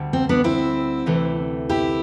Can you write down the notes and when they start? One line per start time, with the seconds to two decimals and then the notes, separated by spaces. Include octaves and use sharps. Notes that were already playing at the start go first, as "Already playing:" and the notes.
Already playing: D2 D3 G3
0.13 C4
0.29 B3 D4
0.44 C4 E4
1.06 D2 C3 E3 A3
1.69 E4 G4